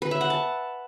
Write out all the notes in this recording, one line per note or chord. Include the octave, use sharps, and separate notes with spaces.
B4
E5
F#5
A5